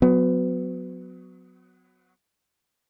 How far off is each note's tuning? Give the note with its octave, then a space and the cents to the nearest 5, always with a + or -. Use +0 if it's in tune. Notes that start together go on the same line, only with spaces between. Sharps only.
F#3 -15 B3 +25